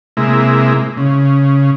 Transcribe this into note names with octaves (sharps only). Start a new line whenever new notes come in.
C3 G#3 A#3 E4
C#3